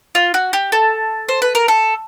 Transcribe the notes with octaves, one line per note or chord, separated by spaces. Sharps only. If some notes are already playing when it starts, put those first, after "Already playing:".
F4
F#4
G4
A4
C5
B4
A#4
A4